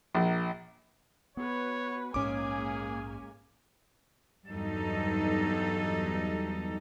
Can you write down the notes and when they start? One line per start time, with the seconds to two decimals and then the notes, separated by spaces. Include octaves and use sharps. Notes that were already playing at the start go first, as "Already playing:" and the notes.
0.15 A#1
1.37 B3 F#4 B4 C#5
2.14 A#1 G#2 G#3 A#3 C#4 G#4 G#5 D6
4.48 E2 G2 F#3 G3 D#4 A4